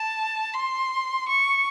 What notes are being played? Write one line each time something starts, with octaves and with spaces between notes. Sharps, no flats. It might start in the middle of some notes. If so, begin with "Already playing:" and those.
Already playing: A5
C6
C#6